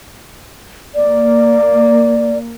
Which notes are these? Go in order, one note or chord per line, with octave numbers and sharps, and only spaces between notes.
A#3 D5